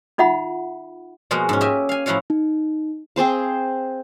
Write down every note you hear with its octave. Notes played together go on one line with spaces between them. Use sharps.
D#4 F4 E5 F#5 B5
B2 F3 G#3 A#3 F#4 A#4
G#2 C#4
G4 D#5 E5 G#5
F5 G#5
A2 F3 E4 F#4 C#5 F5
D#4
C4 G#4 C5 F5